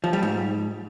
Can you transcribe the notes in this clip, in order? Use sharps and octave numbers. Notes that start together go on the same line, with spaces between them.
F3
G3
G#2